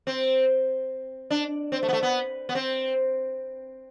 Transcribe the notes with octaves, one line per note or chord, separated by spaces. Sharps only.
C4
D4
C4
A3
B3
A3
B3
B3
C4